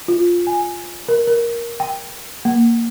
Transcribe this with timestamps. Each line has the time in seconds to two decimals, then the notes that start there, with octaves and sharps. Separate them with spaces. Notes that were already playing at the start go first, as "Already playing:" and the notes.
0.08 F4
0.47 G#5
1.08 A#4
1.27 A#4
1.80 G5
2.45 A#3